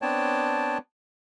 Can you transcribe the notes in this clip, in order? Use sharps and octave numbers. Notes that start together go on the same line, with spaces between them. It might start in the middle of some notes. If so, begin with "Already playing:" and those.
B3 C4 D4 C#5 G5 A5